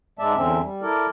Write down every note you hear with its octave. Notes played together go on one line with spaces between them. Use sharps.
G#2 G#3 D5 E5 A5
E2 D3 C4 C#4 E5
G3
E4 A4 A#4 D5